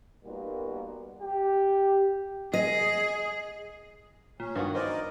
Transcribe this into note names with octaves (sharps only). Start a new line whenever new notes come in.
A#2 G3 A#3 B3 D#4 F#4
G4
G#4 D#5
A#2 C#4
G2 D#3 B3 F4 F#4
E3 A#4 C5 D5 D#5